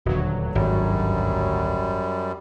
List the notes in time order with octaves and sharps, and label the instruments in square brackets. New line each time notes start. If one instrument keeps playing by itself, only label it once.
[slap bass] D#1 [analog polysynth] D2 G2 F#3
[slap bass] G#1 [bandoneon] F#2 G3